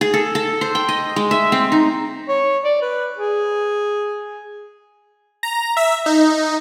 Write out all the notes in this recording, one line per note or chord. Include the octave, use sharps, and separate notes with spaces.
G#4
A4
A4
C5
G5
D#5
G#3
E5
C4
D#4
C#5
D5
B4
G#4
A#5
E5
D#4